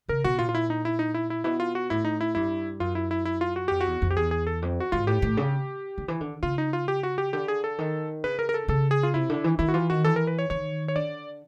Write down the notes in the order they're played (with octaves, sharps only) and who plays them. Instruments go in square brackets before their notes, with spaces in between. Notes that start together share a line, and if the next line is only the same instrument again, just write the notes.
[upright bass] C#3 [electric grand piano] A#4
[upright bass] B2 [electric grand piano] F#4
[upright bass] A#2 [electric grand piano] F4
[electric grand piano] F4
E4
D#4
E4
D#4
E4
E4
[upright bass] B2 [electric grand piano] E4
[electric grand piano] F4
F#4
[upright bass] A2 [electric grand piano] E4
[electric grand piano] D#4
E4
[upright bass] G2 [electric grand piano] E4
[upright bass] F#2 [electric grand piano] F4
[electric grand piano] E4
E4
E4
F4
F#4
[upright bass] F2 [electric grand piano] G4
[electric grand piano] F#4
[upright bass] E2
F2
[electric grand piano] G4
[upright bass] E2 [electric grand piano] G#4
[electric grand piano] G#4
A4
[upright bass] F2
[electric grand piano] F#4
[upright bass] G#2 [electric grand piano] F4
[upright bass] A2 [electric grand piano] G4
[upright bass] A2
C#3
D3
E3
D3
[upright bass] C#3 [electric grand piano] F4
[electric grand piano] D#4
F4
G4
F#4
G4
[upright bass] D3 [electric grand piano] G4
[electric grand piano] G#4
A4
[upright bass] D#3
[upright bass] C#3 [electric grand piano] B4
[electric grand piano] A#4
A#4
A4
[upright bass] C#3 [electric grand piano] A4
[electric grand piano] G#4
F4
[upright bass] C3 [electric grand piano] E4
[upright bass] D3
E3
[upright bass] D#3 [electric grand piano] E4
[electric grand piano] F#4
[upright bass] E3 [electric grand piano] F4
[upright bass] D#3 [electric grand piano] F#4
[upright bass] E3 [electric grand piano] A4
[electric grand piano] A#4
B4
C#5
[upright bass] D#3 [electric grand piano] C#5
[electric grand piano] C#5
[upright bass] D3 [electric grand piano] D5